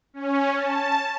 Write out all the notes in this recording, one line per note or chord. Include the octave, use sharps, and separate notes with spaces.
C#4
A5